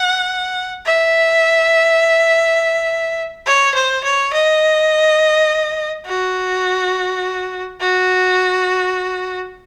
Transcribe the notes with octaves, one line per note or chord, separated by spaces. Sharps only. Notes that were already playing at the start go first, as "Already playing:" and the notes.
Already playing: F#5
E5
C#5
C5
C#5
D#5
F#4
F#4